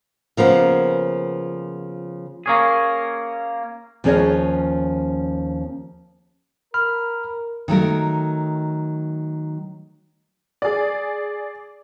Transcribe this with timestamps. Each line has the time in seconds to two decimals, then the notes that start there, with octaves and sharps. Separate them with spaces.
0.37 C#3 F3 A#3 B3
2.46 A#3 C#4 G#4
4.04 D#2 F3 C#4 G#4 C#5 D#5
6.74 A#4 B5 F6
7.68 D#3 F#3 A3 A#4
10.62 G#4 D5